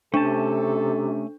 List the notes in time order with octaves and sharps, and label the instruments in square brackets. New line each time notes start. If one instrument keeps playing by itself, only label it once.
[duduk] C3 [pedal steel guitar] A3 C#4 A5 [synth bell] D4 [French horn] A4